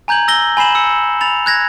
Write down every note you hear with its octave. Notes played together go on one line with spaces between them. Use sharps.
G#5 A#5 G6 G#6 F#7
E6 A#6 G7
G#5 B5 C7 E7 F#7
E6 C#7
B5 A6 F7
F#6 G#6 A#6